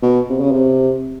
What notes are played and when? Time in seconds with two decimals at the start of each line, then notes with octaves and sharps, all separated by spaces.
0.03 B2
0.30 C3
0.40 C#3
0.51 C3